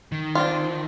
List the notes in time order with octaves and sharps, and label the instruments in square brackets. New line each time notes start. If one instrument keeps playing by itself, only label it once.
[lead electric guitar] D#3
[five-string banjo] C4 D4 F4